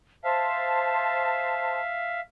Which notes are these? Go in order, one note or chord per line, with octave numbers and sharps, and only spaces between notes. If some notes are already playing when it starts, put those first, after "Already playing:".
C5 E5 F5 A5